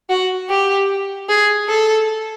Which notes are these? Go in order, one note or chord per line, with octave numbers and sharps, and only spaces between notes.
F#4
G4
G#4
A4